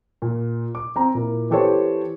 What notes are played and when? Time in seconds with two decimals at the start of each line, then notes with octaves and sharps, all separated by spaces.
0.22 A#2
0.75 D6
0.96 C4 A#5
1.14 A#2 E4 A#4
1.50 E3 B3 G4 A4 C5 C#5